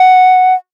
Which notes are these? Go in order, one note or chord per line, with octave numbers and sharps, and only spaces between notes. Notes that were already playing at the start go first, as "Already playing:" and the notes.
Already playing: F#5